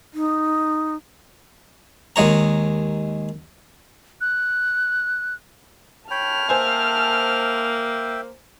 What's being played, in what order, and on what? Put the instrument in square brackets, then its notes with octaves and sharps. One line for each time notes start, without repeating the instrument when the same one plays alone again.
[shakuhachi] D#4
[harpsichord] D#2 G#3 C#5 A#5
[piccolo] F#6
[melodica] C#5 G5 B5 [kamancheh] A5 F6
[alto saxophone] A#3 [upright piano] C5 G#5 [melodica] E5 G5